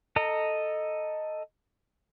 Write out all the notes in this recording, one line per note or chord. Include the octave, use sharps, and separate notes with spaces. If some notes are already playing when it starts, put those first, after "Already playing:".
A4 D#5 A#5